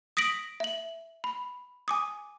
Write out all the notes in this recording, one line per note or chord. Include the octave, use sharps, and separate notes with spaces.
D#6 A#6 B6 D7 F#7
E5 F#7
B5
G#5 D6 D#6